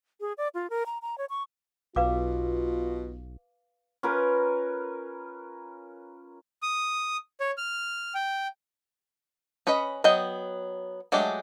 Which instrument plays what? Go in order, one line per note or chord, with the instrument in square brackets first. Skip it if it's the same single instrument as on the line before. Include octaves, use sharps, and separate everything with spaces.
[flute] G#4
D5
F4
A#4
A#5
A#5
C#5
C#6
[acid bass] B1 [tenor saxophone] B2 [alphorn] F4 [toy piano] B4 F5 D6
[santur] C#4 F4 A#4 B4
[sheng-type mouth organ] D#6
C#5
F6
G5
[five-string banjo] C#4 B4 C#5 D#5 B5
F#3 B3 D#5 G5
F#3 G#3 A3 D4 G4